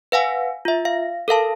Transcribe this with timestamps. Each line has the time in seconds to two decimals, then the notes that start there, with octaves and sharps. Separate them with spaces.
0.12 B4 F5 F#5 G#5
0.65 F4 E5
0.85 F5
1.28 A4 A#4 F5 A5